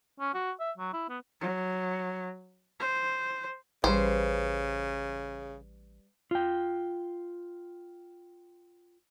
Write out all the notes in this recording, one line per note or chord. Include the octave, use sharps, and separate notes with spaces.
C#4
F#4
E5
F#3
E4
B3
F#3
C5
A1 C#3 G3 B4 C5
F4 G5